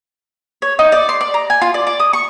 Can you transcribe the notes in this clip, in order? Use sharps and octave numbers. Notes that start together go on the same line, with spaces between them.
C#5
D#4
D5
C6
D5
A#5
G#5
F4
D5
D5
D#6
C#6